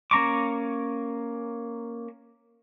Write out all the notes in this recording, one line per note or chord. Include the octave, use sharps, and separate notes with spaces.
A#3 C#4 A#5 C#6 D6